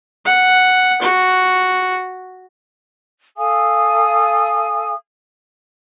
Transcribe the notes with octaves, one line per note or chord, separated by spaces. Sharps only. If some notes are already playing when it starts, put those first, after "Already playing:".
F#5
F#4
A4 F5 G#5 D#6